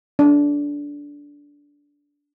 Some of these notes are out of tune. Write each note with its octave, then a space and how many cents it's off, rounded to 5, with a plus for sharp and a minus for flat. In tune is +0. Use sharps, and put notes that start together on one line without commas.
D4 -20